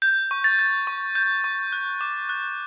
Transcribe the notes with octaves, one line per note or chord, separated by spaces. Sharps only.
G6
C#6
A6
G6
C#6
G6
C#6
F#6
D6
F#6